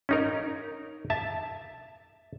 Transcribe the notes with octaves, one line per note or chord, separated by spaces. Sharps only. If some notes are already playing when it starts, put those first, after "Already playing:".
C#4 D#4 A#4
E5 A5